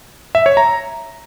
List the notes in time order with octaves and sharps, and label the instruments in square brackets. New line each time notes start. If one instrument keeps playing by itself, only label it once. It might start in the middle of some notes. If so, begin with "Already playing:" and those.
[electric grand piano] E5
C#5
A#5